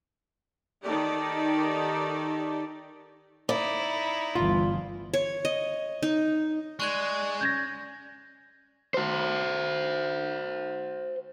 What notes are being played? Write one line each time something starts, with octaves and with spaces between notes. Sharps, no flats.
D#3 D#4 G4 A4 D5
D#4 E4 D5
G1 D2 E3 F4
C#5
D#5
D#4
G#3 D5 C#6 F#6 G#6
C#4 G6 G#6 A#6
F#4 C5